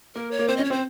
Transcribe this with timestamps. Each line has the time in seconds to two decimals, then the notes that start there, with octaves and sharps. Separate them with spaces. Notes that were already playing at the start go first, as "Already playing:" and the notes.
0.15 A#3 A#4
0.31 C#5
0.39 A#3
0.48 C4 C5
0.57 C#4 D#5
0.65 C#5
0.70 C4 C5